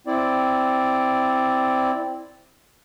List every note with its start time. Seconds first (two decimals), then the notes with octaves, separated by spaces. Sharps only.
0.07 C4 E4 D5